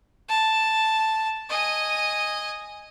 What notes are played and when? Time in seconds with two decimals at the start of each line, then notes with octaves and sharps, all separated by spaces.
0.29 A5
1.50 D#5 G#5